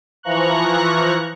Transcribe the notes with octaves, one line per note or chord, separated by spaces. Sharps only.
E3 F3 A#5 C#6 F#6